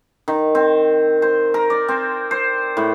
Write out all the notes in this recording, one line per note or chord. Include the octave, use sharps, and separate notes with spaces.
D#3
C4
C5
A#4
D5
C4
C5
A2